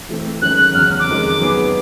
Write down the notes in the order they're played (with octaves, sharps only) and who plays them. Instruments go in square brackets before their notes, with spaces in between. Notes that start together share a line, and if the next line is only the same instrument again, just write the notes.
[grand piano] E3 A3 C4
[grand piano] F#2 D#3 G#3 C#4 [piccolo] F#6
[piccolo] F#6
[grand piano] E2 C#3 F#3 [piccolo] F6
[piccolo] F#6
D6
[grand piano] F2 C3 D#3 G#3 C#4
F#3 B3 D#4 G#4 B4